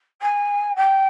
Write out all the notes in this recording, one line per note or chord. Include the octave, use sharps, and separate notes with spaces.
G#5
G5